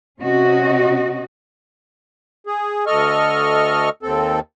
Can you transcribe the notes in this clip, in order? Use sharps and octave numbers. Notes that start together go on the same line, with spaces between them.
C3 C#4 F#4 D#5
G#4
D2 A4 D#5 C#6 F6
D#2 C4 A4